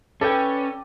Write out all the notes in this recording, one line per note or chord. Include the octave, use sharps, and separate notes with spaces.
C#4 A4 B4 D5 G5